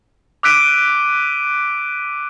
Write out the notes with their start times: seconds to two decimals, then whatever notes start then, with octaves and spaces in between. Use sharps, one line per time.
0.43 D6 E6 F#6 B6 D7 D#7